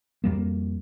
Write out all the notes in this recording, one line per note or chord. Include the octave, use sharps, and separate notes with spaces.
F2 G3 A#3